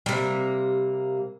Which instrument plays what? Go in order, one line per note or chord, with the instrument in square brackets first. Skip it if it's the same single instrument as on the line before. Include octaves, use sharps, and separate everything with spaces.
[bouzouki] C3 A#3 [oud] G3